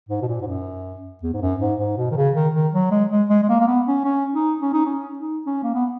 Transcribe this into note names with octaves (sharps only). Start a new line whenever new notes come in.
G#2
B2
A#2
G#2
F#2
E2
G#2
F#2
G#2
G#2
B2
D#3
C#3
D#3
D#3
F#3
G#3
G#3
G#3
G#3
A#3
A#3
B3
C#4
C#4
D#4
C#4
D#4
C#4
D#4
C#4
A#3
B3